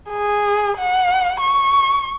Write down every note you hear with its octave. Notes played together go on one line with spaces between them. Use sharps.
G#4
F#5
C#6